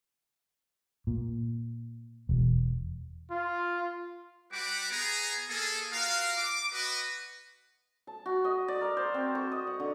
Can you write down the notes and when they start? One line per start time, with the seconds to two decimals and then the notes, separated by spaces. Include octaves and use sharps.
1.07 A#2
2.29 E1
3.31 F4
4.52 G3 F#4 G4 B4 F#5 D6
4.91 B3 G#4 A#5
5.49 A#3 G#4 A4
5.92 F4 F#4 A#4 F5
6.37 D6
6.72 F#4 B4 D#5
8.07 A5
8.26 F#4
8.44 D#5
8.68 D5
8.81 A#4
8.97 C5
9.14 C4
9.35 C#6
9.52 D#5
9.67 F#5
9.80 D3